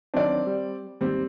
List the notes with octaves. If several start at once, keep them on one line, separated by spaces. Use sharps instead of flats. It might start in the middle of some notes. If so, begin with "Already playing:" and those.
D#3 F#3 C4 D4 D5
G3
D#2 G#2 G3 C4